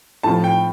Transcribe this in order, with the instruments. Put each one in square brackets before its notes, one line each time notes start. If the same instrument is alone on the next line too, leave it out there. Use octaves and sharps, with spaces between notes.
[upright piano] A2 F3 C4 [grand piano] A5
[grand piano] G5